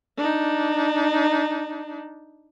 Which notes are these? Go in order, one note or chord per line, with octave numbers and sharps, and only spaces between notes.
D4 D#4